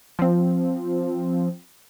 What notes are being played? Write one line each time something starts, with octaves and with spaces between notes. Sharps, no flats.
F3 C4